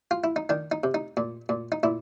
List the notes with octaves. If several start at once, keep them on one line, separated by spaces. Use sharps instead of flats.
F4
E4
D#4
D#3 D4
D#4
C3
D#4
A#2
A#2
D#4
A#2 E4